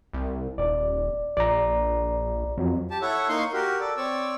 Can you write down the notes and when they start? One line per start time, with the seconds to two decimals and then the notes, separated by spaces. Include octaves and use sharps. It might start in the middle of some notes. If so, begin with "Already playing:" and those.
0.13 C2
0.58 D#1 D5
1.37 A#1 D5 A#5
2.58 F2 F#3
2.91 G4 A5
3.02 E4 A4 C#5 E5 F#5
3.29 A#3 D#4 F5 C6 C#6
3.54 F#4 G4 A#4
3.80 A4 D5
3.97 C4 C#5 D5 E6